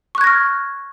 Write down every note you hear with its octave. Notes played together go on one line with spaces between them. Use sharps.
C#6 F6 F#6 G#6 A#6